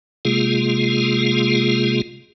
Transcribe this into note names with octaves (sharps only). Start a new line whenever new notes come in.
C3 G#3 A#3 F4 G#4